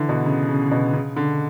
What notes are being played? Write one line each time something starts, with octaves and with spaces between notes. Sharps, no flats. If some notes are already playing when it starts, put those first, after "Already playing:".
Already playing: D3 E3
B2
C#3
C#3
B2
C#3
D3